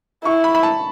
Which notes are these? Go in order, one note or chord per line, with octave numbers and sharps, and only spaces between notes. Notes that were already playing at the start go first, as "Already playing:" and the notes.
E4 C#6
B5
B5
A5